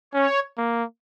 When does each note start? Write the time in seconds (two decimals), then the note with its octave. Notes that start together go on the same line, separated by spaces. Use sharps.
0.14 C#4 C#5
0.58 A#3